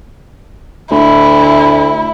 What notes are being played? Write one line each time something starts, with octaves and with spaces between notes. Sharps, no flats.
D2 E4